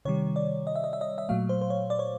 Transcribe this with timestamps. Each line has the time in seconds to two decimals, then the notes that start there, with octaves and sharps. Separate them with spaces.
0.05 C3 D#3 G3 C#5
0.36 D5
0.67 D#5
0.76 E5
0.84 D#5
0.93 E5
1.01 D#5
1.18 E5
1.29 A#2 F#3 A3 F5
1.49 C5
1.61 C5
1.70 C#5
1.90 D5
1.99 C#5